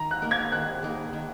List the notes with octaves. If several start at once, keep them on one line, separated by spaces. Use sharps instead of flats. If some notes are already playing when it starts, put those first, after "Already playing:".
Already playing: D#3 A#5
F#6
A#3 D#4 A#4
G#6
D#3 F#6
A#3 D#4 A#4
D#3